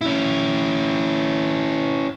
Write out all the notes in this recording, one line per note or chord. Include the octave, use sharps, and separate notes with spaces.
C#4 E4